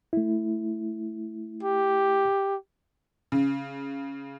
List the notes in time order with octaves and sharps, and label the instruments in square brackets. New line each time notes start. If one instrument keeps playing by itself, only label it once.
[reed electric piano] A3 E4
[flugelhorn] G4
[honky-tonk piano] C#3